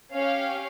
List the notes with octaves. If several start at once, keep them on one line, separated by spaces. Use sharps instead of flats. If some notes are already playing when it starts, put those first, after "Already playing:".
C#4 G4 C#5 F5